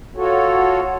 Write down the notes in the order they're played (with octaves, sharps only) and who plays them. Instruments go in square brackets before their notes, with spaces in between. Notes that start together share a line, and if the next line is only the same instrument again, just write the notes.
[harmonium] F4 F#4 A4 C#5